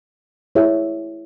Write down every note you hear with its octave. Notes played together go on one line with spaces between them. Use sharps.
E4 G#4 C#5 E5